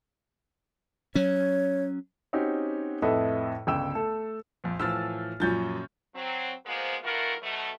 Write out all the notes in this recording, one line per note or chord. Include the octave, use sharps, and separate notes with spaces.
F#3 C#4 C#5
C4 C#4 D#4 F#4 G4
F2 A2 A4 B4 D#5 E5
G1 C#2 G5 E6 E7
A3 A4
A#1 F2
A2 E3 F3 E6 F6 A6
F#2 A#2 F3 C#4 G6 A6
F#3 C4
G#3 A#3 B3 F4 C5
D#3 E3 A3 F4 F#4 A#4
B2 F#3 A3